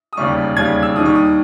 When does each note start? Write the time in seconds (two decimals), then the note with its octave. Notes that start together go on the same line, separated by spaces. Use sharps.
0.13 D#6
0.17 E1 D#2 C#3 G3 C#6
0.57 E1 D#2 C#3 G3 G#6
0.83 E6
0.96 D#2 D#3 G3 D#6
1.05 C#6
1.15 D#6